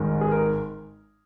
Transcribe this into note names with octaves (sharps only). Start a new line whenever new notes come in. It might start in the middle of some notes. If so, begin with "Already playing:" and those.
Already playing: G#1 G#2 D#3 G#3
G#4
A#4